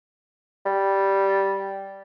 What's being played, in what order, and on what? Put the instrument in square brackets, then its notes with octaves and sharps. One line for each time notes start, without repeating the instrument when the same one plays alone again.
[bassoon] G3